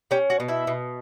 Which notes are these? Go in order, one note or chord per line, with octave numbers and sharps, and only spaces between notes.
C#4 G4 G5
F#4 F#5
B2
E4 E5
B2